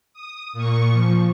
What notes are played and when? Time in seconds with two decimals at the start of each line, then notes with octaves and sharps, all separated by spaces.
0.13 D#6
0.53 A#2 C#6
0.92 F3